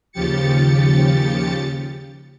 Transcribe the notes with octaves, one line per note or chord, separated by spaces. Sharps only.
D#2 C#3 F3 G4 A6 C#7